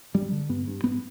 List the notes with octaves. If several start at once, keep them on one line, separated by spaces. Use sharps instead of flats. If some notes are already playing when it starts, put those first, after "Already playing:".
G2 G3
D3
G2 B3
G2
G#2 B3